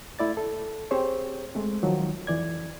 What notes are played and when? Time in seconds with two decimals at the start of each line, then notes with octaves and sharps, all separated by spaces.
0.19 A3 E4 D5 A6
0.37 A4
0.91 C4 G4 G#4 C5 C#5
1.55 G#3 A3 C4
1.83 D#3 F3 F#3
2.27 F2 E3 D5 G#6